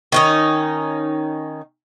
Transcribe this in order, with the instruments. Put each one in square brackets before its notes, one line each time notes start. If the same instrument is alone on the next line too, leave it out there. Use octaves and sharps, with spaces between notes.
[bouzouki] D#3 C#4 D#4